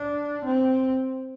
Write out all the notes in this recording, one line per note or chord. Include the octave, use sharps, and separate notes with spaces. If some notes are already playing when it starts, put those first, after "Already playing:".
Already playing: D4
C4